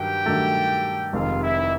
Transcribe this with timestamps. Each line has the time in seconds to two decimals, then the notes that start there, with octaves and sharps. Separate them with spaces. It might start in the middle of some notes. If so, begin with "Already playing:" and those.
Already playing: G2 D#3 F#3 G4 G5
0.26 G2 D#3 F#3 A3
1.13 F1 F2 C3 D#3 G#3 F4 F5
1.42 E4 E5